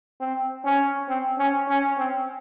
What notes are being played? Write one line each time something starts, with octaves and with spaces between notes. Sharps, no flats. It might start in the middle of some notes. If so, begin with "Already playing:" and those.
C4
C#4
C4
C#4
C#4
C4